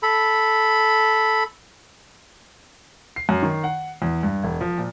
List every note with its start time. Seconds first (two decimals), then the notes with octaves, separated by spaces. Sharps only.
0.03 A4 B5
3.16 C7
3.29 F#2
3.43 D#3
3.64 F#5
4.02 E2
4.23 G2
4.44 E1
4.61 F3
4.78 A#2